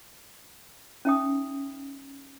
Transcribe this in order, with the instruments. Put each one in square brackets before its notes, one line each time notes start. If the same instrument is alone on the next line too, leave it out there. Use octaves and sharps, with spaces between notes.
[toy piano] C#4 D#4 E5 G5 D#6